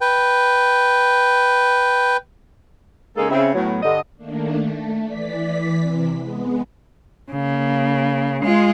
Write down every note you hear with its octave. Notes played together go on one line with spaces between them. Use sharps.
B4 G5
C#3 G#3 A#3 D#4 G#4 A4
C#3 C4 E4
A2 F#3 B3
G2 D3 D#5
D#3 A3 A#3 D4
A3
E3 D5 B6
C3 E3 C4
G#3 B3
C#3 A#3
G#3 F4